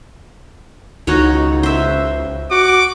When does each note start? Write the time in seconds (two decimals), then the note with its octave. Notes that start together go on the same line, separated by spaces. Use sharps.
1.07 C#2 D#4 F#4 C#5
1.63 C5 E5
2.51 F#4 D6